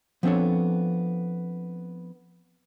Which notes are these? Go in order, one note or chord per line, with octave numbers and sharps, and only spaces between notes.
F3 B3 C4 D4 A4 C#5